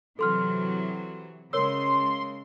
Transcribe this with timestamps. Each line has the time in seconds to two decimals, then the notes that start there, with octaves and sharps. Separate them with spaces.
0.19 C3 E3 F#3 A4 C6 F6
1.53 C#3 G#3 A#4 C#5 C6 E6